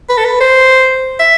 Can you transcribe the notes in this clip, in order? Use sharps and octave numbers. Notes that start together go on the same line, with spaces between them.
B4
A4
B4
C5
E5